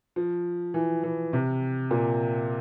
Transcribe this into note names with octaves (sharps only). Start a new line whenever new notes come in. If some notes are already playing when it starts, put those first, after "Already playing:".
F3
E3
E3
C3
A#2